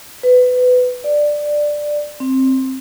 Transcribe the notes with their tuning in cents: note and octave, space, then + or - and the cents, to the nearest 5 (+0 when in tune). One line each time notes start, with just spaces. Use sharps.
B4 +20
D5 +10
C4 +10